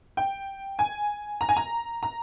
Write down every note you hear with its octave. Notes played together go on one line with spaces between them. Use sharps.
G5
G#5
A#5
G#5
A#5
A#5